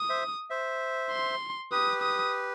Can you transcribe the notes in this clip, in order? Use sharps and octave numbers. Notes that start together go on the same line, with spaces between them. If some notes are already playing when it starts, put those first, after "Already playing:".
Already playing: D#6
C5 E5
C5 E5
C6
G4 B4 D#6
D#6